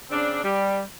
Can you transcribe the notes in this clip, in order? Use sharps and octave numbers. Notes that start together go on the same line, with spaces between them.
C#3 C4 D4
G3